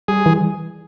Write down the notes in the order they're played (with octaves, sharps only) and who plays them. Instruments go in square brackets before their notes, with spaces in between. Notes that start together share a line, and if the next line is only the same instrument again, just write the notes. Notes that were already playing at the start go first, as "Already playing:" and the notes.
[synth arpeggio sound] G3 [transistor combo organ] G#4
[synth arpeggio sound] E3